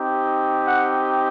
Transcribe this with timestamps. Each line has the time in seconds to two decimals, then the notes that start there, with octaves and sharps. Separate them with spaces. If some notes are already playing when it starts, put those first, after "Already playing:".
Already playing: C4 D#4 G4
0.65 F#5